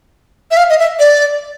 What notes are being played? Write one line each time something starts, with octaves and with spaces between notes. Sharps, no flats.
E5
F5
D#5
E5
D5